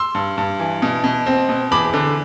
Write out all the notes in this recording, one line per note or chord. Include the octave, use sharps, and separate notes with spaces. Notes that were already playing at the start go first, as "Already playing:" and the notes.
Already playing: C6 E6
G2
G2
E3
B2
B2
C4
B2
E2 B5 D6
D3